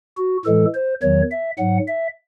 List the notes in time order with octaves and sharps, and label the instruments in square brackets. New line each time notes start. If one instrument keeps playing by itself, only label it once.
[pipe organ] F#4
A2 E3 G#3 A4
C5
E2 D#3 F#3 C#5
E5
G#2 F#3 F#5
E5